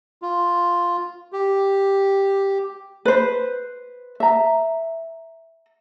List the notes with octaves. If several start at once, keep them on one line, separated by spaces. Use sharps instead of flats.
F4
G4
B4 C5
E5 A#5